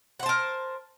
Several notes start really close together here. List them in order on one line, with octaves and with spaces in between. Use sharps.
F#5 C5 A5 A#4